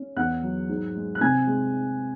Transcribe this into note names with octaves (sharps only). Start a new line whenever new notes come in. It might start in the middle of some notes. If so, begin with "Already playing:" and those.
Already playing: C#4
E2 F#5 F#6
F#3
G#2
G#3
F#6
C3 G#5 G#6
G#3